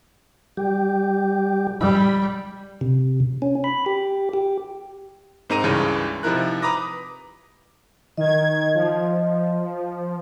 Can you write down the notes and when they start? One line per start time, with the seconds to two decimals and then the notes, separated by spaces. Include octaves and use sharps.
0.57 G3 G4
1.81 G3 B5
2.81 C3
3.42 C#4
3.64 B5
3.86 G4
4.34 G4
5.50 G#2 C4 D#4 A#4 A#5 D#7
5.64 C#2 G2 C#3 E3
6.23 C3 F3 D#4 E4 A#4 F#6
6.62 B4 A#5 B5 D6 D#6 A#6
8.18 D#3 D#5 G#6
8.75 F3